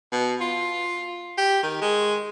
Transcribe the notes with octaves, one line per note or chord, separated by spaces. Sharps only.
B2
F4
G4
D#3
G#3